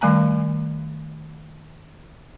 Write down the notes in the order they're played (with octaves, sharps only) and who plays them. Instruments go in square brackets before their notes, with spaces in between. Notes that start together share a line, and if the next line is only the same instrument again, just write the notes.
[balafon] D#3 G3 A3 G#5 A#5